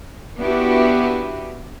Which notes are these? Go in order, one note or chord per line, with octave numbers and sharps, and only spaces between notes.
B3 D4 E4 F#4 G4 B4